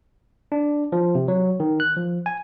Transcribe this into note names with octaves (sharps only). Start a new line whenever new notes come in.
D4
F3
C3
F#3
D#3
F#6
F3
G#5